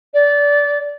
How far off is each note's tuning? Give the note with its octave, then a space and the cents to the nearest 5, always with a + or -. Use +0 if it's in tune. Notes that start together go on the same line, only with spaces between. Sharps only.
D5 -20